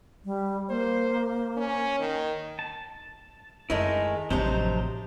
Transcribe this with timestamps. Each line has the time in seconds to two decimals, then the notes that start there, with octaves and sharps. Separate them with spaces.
0.25 G3
0.69 A#3 C5
1.57 C#4
1.99 D#3
2.59 A5
3.70 F#2 D#3 G#3 A3 E4 G#4 A#4
4.30 A1 C3 F3 F#3 D4 D#4 C5 C6